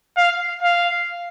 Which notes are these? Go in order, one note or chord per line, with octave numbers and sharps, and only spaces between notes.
F5
F5